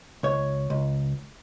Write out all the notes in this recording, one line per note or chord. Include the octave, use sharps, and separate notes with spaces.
C#2 C#5
C#2